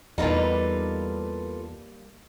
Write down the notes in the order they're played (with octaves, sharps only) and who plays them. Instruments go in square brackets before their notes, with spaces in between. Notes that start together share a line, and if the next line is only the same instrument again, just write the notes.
[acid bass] E2 [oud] G3 A#3 D#4 [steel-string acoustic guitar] F4 A4 B4